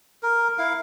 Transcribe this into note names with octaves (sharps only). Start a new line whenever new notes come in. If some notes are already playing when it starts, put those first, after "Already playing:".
A#4
E4 F5